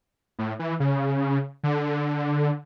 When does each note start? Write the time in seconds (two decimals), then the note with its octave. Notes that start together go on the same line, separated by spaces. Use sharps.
0.39 A2
0.59 E3
0.80 C#3
1.63 D3